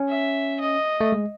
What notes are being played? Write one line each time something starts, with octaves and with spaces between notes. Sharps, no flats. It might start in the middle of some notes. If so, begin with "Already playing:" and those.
Already playing: C#4
E5
D#5
A3
G#3